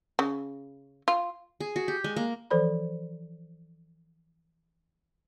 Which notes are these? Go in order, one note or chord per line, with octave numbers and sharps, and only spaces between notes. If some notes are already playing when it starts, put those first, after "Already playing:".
C#3
F4
G#4
F#4
G4
G#3
A#3
E3 F3 A4 C5 D5 B5